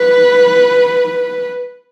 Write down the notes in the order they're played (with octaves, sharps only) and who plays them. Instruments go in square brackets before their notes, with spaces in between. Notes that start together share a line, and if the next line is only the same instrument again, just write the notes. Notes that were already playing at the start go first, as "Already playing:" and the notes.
Already playing: [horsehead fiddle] B4